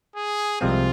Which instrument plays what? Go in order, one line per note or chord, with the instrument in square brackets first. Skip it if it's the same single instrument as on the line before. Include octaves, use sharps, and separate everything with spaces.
[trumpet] G#4
[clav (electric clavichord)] C2 C3 F3 G#3 C4 [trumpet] F4